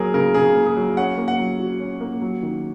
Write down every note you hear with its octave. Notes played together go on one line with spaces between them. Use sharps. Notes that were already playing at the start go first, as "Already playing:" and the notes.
Already playing: F#3 A#3 G#4 A#4
C#3 A#4
C#3 G#4
A#3
G#4
F#3
C#4 F#5
A#3
F#5
F#3
F#4
C#4
A#3
F#3
D#3